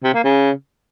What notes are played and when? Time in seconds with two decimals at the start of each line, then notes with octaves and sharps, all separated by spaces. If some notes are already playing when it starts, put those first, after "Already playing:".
0.04 C3
0.14 A#3
0.24 C#3